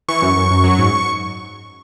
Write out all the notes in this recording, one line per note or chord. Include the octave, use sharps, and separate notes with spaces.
E3 C#6
F#2
F#2
F#2
F#3
G#2